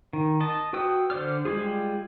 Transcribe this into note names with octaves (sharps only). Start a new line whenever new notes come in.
D#3
D#5 A5
F#4 B4 G5 D#6 E6
D3 C5 D5 F6
G3 G#3 F4 G#4